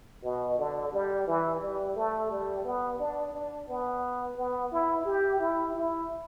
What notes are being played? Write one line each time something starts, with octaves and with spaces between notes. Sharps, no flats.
B2
D3
G3
E3
G3
A3
G3
B3
D4
D4
B3
B3
E4
G4
E4
E4